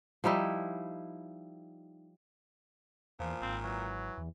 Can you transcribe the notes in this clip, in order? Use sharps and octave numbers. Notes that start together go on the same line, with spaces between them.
F3 G3 D#4 E4
E2 A#2 F3
G#1 C4
E3 F#3
E2